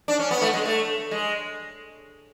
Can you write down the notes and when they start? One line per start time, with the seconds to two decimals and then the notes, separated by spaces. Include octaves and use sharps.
0.08 D4
0.19 C#4
0.31 B3
0.42 A3
0.53 G#3
0.65 A3
1.11 G#3